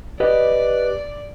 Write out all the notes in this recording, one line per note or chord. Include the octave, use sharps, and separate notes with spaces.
G4 B4 D5 D#5